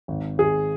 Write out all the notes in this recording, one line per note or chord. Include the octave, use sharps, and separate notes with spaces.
G#1
G#1 G#4